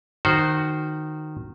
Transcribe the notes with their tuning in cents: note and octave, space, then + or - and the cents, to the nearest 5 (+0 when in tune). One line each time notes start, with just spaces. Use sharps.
D#3 -15 F#4 +0 C5 +0